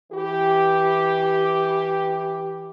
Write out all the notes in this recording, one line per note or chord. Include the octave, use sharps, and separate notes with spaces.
E3 G4